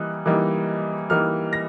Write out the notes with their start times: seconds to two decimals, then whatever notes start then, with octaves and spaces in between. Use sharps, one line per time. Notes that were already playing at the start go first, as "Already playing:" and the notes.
Already playing: E3 G3 A#3 D#4 F#6
0.26 E3 G3 A#3 D#4
1.10 E3 G3 A#3 D#4 F6
1.53 A#6